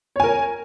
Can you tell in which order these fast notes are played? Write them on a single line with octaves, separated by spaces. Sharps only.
C#5 G#5 A#4